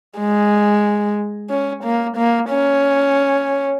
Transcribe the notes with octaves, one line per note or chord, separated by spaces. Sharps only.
G#3
C#4
A#3
A#3
C#4